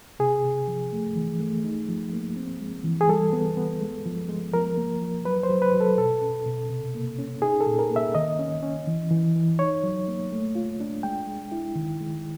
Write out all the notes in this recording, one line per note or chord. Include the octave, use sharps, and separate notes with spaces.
C3 G#4
C3
F3
A3
E3
A3
D#4
F3
A#3
C4
G#3
E3
G#4
G3 A4
B3
B3
G#3
F3
G#3
F3 A#4
A#3
F3
F#3 B4
C5
F#3
B4
F#3
A4
B2 A4
C#4
B2
C3
A#3
C#4
D#4 G#4
A4
A#2
A#4
A#3
E5
D#3 D#5
C#4
C#4
E3
E3
E3
D#4 C#5
F#3
A#3
A3
F4
D4
G#3 G5
G#3
E4
D#3
G#3